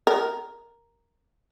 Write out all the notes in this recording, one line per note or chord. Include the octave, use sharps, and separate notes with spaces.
A#4